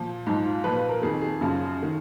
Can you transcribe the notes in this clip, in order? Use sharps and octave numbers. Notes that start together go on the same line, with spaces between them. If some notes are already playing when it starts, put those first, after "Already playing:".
Already playing: A#2 F3
G#2 F3 D#4
F4
A#2 F3 B4
B4
A#4
F2 D#3 G#4
G#4
F#2 C#3 F3
D#3